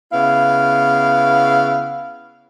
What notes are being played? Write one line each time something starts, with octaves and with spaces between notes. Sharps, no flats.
C#3 B3 E4 F5